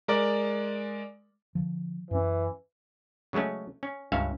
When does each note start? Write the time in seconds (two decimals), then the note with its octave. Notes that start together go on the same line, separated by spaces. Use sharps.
0.08 G#3 A#4 D5
1.55 D3 F3
2.11 F#2 E3 C#4
3.33 C#3 F#3 G#3 A3 C#4
3.83 C#4
4.12 C#2 G2 C#4 E5 F5